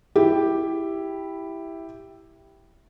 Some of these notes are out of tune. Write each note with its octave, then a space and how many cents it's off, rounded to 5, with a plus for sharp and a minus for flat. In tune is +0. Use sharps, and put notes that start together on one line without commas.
E4 +0 G4 +0